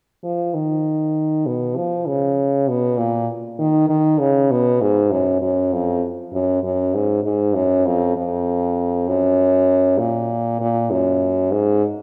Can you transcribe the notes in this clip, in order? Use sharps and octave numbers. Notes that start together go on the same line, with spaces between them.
F3
D#3
B2
F3
C#3
B2
A#2
D#3
D#3
C#3
B2
G#2
F#2
F#2
F2
F#2
F#2
G#2
G#2
F#2
F2
F2
F#2
A#2
A#2
F#2
G#2